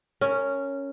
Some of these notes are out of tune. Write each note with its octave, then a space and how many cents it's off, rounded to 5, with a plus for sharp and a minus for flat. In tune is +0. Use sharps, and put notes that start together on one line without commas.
C#4 +0 A#4 -25